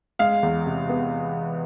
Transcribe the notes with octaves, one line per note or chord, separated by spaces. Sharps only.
G#3 F5
E2
C3
B3